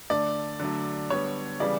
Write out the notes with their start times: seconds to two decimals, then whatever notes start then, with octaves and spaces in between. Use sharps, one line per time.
0.10 D3 A3 D5
0.60 D3 F#3 A3
1.10 D3 G3 B3 C#5
1.60 C#3 E3 G3 B3 D5